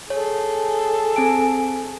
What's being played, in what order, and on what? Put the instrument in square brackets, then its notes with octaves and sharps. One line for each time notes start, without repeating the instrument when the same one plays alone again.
[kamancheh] G#4 A4 [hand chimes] C#5
[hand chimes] C4 G#5 D7